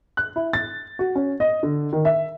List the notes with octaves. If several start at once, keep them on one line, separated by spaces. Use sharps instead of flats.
F#6
E4
A6
F#4
C#4
D#5
D3
D#3
E5